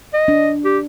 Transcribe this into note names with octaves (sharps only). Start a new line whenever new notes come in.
D#5
D4
G4